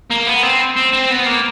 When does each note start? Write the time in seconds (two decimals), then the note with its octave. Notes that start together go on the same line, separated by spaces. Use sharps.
0.11 A#3
0.27 B3
0.43 C4
0.76 C4
0.93 C4
1.10 B3
1.26 A#3